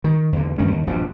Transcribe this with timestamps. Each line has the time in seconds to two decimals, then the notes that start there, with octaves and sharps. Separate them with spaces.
0.04 D#3
0.33 E2 D3
0.58 E1 G2 D#3 C#4
0.71 D#2
0.87 E1 A#1 G2 F3